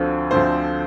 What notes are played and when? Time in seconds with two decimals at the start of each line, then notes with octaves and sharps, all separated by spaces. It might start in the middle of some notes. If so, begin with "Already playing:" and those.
Already playing: D2 D3 F3 C4
0.31 D2 D3 F3 C4 C5